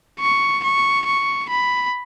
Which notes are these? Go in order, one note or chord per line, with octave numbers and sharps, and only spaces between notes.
C#6
C#6
C#6
B5